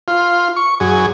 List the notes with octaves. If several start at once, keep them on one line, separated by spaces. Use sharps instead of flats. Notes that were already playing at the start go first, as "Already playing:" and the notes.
F4
C#6
F#2 G#4